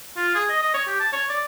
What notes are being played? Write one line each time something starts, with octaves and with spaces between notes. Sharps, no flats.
F4
G#4
D#5
D#5
C#5
G4
A5
C#5
D5